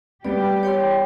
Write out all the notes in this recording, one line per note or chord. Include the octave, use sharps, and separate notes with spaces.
G3 B3 G4 D5
C#5 G5 C6